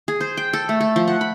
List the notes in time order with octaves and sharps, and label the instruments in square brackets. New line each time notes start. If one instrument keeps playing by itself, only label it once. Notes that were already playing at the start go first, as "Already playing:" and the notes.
[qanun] G#4
C5
G5
A4
A3
A4
F3
F#5
B5